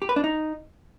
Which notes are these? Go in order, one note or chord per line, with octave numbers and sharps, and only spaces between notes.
G4
B4
D4
D#4